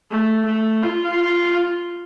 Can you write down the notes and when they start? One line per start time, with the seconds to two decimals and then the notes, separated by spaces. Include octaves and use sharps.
0.11 A3
0.46 A3
0.82 F4